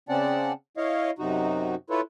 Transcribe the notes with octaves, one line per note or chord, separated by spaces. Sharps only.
C#3 C4 C#4 D5 F#5 A5
E4 C#5 D#5 F5
F#2 C3 D#4 F#4
E4 F4 A4 B4 C#5